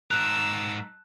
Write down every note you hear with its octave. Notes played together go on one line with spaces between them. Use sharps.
G#2 A#4 A5 E6 F#6